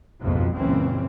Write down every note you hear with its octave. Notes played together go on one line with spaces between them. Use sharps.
F#1 B1 F2 G#2 B2 F3
F#1 C#2 A#2 E3 C4 C#4